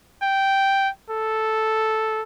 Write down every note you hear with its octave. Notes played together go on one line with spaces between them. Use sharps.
G5
A4